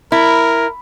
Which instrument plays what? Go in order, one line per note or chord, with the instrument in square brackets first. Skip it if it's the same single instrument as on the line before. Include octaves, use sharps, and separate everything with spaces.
[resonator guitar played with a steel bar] E4 [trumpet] A#4